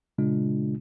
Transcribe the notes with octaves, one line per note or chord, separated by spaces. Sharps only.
A#2 C#3 G#3 D4 F4